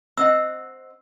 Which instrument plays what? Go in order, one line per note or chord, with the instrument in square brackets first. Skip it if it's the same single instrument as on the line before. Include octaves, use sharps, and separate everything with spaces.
[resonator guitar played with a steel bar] C4 D#5 F#5 [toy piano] E6